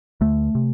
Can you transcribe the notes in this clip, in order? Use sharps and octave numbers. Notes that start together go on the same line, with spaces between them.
D2 A3
C3